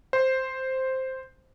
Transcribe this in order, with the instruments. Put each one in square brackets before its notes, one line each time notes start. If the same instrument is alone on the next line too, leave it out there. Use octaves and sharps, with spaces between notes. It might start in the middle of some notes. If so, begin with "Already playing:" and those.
[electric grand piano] C5